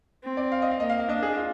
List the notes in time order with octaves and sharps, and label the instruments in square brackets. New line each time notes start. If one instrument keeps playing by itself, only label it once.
[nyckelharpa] C4
[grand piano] D5
F5
D#5
F5
[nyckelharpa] A#3 [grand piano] D#5
[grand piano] F5
F5
[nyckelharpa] D4 [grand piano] D#5
[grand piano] G#4
F4